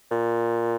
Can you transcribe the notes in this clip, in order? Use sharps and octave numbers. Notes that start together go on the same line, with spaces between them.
A#2